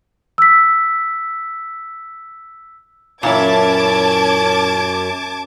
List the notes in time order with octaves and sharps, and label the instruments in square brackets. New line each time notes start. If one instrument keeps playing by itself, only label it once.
[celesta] E6 B6
[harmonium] F#2 [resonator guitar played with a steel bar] A#2 E3 E4 [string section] C#4 [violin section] A5 D6 G#6